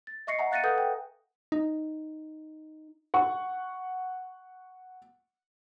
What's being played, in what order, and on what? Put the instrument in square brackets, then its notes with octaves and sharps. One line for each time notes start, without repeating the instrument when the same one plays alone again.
[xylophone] A6
D#5 E5 C#6 A#6 C7 C#7
E5 F#5 G#5 A#5
F5 F#6 A6 A#6 C#7 D#7
A4 B4 F#5 G#5 D#6 G6
G5
[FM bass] D#4
[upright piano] F#5 C#6